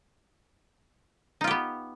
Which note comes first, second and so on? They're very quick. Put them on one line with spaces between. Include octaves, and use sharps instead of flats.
D#4 F4 G4 B3